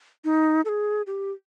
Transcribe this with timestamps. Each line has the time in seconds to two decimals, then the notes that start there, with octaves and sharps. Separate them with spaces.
0.24 D#4
0.65 A4
0.69 G#4
1.07 G4